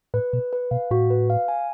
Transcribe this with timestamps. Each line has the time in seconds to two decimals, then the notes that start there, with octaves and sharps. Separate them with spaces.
0.14 A2 B4
0.33 B2 B4
0.53 B4
0.71 B2 F5
0.91 A2 F#4
1.10 B4
1.30 F5
1.48 G#5